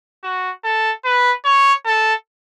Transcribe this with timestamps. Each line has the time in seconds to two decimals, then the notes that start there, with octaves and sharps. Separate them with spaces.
0.24 F#4
0.64 A4
1.05 B4
1.45 C#5
1.86 A4